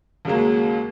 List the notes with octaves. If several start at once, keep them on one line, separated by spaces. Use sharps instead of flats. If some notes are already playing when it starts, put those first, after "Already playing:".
D#2 C#3 F#3 G#3 A#3